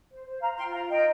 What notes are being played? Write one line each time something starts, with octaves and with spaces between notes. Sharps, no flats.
C5
C5
C5 F5 A#5
F4 G5 C6
F4 F5 A#5
D#4 D#5 G5